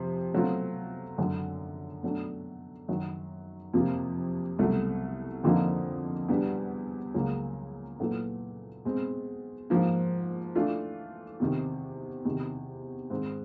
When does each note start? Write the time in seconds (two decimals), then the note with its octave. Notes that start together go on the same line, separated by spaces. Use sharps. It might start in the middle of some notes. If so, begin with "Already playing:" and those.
Already playing: F2 C3 F3
0.33 B2 F#3 A3 C4 F4
1.18 F#2 D3 F#3
2.03 B2 F#3 A3 D4
2.88 F#2 D#3 F#3
3.74 F2 C3 F3 A#3
4.58 C2 B2 F#3 A3
5.44 F2 D3 F3 A#3 D#4
6.29 E2 B2 G3 B3 D4
7.14 C#2 C#3 F#3 A#3
7.99 A#2 F#3 B3 E4 A4
8.85 B2 G#3 C4
9.70 G#2 F3 A#3
10.55 E3 A3 D4 F4
11.40 E2 C3 D#3
12.25 E2 C3 D#3
13.10 G#2 D#3 G#3 C4